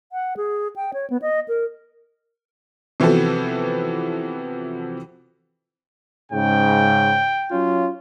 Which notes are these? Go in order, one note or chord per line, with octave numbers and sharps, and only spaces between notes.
F#5
G#4
G5
C#5
B3
D#5
A#4
C3 E3 F3 B3 F#4 A4
G#2 C#3 G5
F#3 C#4 F4